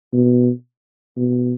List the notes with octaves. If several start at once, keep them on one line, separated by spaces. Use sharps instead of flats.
B2
B2